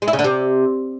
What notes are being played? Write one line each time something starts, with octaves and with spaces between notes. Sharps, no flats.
G#3
E4
C#3
D3
C3